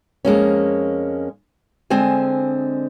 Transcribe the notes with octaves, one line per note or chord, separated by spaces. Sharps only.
F2 G#3 A#3 C#4
D3 G#3 C4 C5 G#5